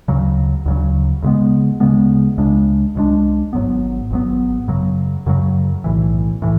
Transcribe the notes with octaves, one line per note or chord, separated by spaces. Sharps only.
D2 C#3 F#3
D2 C#3 F#3
D2 C#3 G#3 B3
D2 C#3 G#3 B3
C#2 C#3 G#3 D4
C#2 C#3 G#3 D4
G#1 G#2 F#3 B3
G#1 G#2 F#3 B3
F#2 C#3 F#3
F#2 C#3 F#3
B1 A2 E3
A2 E3